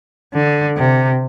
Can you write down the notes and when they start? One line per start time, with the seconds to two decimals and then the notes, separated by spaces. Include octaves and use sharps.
0.34 D3
0.77 C3